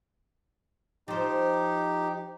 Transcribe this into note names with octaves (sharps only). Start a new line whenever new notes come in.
F3 D#4 G4 C5